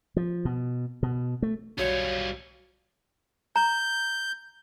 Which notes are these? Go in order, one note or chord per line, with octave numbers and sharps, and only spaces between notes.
F3
B2
B2
A3
B1 G3 F4 F#4 C#5 C#7
A#5 G6